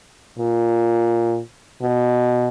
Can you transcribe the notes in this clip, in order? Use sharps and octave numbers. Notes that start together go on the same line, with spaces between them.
A#2
B2